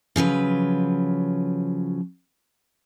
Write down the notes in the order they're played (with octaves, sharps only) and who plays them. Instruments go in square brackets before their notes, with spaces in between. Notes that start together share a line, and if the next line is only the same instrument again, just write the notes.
[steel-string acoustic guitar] C#3 F3 F#3 B4